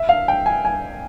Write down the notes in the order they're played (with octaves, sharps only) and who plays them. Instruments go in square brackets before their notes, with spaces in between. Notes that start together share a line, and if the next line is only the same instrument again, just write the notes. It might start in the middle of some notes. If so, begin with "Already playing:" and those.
Already playing: [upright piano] E5
F5
G5
G#5
G#5